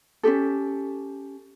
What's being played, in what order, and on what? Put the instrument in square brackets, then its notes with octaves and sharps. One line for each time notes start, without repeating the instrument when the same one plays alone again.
[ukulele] C#4 D#4 G4 A4